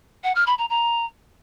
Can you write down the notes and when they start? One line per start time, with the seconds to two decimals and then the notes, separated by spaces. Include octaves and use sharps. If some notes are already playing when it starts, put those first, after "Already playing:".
0.24 F#5
0.35 F6
0.47 B5
0.58 A#5
0.70 A#5